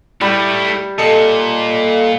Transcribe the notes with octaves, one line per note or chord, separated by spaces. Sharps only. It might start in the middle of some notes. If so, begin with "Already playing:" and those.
G3 A3 E4
A#2 A4 D#5 C#7